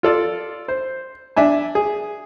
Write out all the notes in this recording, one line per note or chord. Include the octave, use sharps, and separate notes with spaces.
F4 A4 D5
C5
D4 E5 G#5
G#4